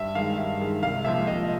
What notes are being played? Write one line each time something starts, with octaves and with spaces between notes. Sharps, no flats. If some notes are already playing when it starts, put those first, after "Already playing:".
Already playing: G2 E5
D#3 G#3 F5
G2 E5
D#3 G#3
C2 F5
A#2 F3 G#3 E5
C2 D#5